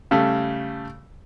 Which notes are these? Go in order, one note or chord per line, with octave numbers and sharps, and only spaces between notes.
C#3 G3 A3